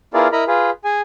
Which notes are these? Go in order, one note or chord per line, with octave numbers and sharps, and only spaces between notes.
B3 E4 F4 G#4 A#4 D5
E4 A#4 D#5 A#5 B5
F4 G#4 B4
G#4 G#5